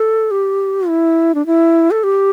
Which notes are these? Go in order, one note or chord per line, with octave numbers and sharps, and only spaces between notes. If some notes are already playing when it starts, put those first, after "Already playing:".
Already playing: A4
G4
E4
D4
E4
A4
G4